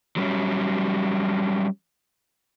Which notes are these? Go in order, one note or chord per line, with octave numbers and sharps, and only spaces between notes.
F#3 G3 C#4